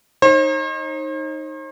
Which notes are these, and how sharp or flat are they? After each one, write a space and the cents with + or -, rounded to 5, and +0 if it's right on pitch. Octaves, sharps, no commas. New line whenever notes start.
D#4 +0 C5 +45